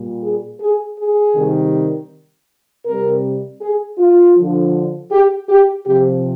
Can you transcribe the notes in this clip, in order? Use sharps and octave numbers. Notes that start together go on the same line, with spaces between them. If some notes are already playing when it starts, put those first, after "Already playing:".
Already playing: A#2 G3
G#4
G#4
G#4
C3 D#3 G3
C3 G3 A#4
G#4
F4
D3 F3
G4
G4
C3 F3 G4